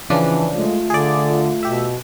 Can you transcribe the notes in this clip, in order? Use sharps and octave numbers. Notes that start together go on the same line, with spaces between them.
C#3 E3 F3 D4
G#3 A3 F4
D3 G#4 D5
B2 G4 E5